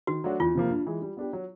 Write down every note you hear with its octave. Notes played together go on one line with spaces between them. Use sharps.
D#3 F#4
F#3 A3 D4 F#4
E2 F4
C3 F3 A#3
G2
E3 G#3
G3
B3 D4 G4
F#3